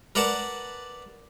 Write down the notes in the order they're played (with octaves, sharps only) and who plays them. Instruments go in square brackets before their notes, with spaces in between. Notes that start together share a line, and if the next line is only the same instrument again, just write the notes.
[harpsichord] A#4 B4 D5 F#5 A5